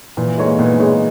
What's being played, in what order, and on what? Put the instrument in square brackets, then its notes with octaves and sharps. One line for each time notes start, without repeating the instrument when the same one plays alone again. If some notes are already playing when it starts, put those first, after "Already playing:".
[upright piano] A#2 [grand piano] E3
[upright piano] G#3 D#4 G#4 C#5
[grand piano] A#3
[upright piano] A#2 [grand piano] B3
[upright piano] G#3 D#4 G#4 C#5